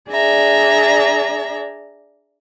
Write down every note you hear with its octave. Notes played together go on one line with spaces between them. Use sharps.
D4 G#4 D5 E5 A#5